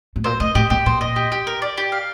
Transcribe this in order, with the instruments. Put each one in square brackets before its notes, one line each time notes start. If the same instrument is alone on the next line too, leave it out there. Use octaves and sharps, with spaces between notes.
[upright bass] A2
[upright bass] A#2 [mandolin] C5
[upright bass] A2 [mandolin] D#5
[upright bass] A2 [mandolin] G4
[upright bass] A#2 [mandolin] G4
[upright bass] A#2 [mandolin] C5
[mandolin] D#5
G4
G4
A#4
D5
G4
F5